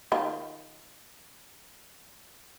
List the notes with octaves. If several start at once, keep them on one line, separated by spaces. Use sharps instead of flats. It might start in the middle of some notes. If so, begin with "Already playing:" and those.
D#3 F4